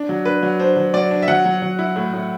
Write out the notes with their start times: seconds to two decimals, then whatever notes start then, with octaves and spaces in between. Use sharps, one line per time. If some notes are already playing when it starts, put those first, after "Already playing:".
Already playing: D4
0.09 F#3
0.25 D4 B4
0.43 F#3
0.59 D4 C5
0.77 F#3
0.93 F#3 D5
1.11 D4
1.22 E5
1.28 F#3 F#5
1.45 F#3
1.62 F#3
1.79 E4
1.96 A2
2.13 A2